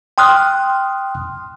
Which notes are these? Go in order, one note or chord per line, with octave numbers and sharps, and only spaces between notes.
G5 C6 D#6 F6 F#6